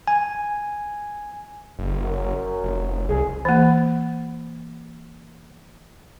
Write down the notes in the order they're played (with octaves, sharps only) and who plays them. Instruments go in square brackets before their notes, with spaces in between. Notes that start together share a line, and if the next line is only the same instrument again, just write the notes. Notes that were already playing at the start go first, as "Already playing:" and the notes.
[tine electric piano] G#5
[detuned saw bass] F#1
[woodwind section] F#2
[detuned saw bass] F1
[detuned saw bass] C2 [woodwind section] G#4
[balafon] E3 A#3